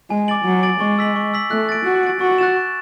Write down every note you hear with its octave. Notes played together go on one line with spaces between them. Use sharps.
G#3 G#5
D6 A6 D7 F#7
F#3 G#5
D6 A6 D7 F#7
G#3 C#6
E6 B6 F#7
C#6
E6 B6 F#7
A3 F#6
A6 D7
F#4 F#6
A6 D7
F#4 C#6
F#6 A6 E7
C#6